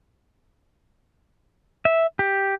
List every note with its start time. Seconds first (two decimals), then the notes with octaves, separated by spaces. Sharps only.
1.85 E5
2.19 G4